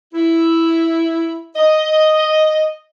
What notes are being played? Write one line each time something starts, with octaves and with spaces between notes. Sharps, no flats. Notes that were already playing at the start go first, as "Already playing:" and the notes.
E4
D#5